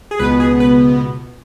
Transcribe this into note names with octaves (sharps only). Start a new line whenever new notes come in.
G#4
C#2 B2 B3 B4
G#4
B4